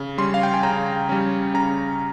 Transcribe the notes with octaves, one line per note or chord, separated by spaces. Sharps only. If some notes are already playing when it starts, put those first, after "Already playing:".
Already playing: C#3
G3 C#4 C6
F5
G5
G#5
C#3 A#5
G3 C#4
C#3 A#5